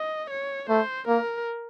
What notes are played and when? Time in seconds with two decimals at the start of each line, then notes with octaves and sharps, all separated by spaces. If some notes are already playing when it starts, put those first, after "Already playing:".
Already playing: D#5
0.31 C#5
0.69 A3 C5
1.08 A#3 A#4